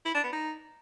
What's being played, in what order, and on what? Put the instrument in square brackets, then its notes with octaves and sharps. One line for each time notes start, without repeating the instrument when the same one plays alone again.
[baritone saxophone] E4
D4
B3
D#4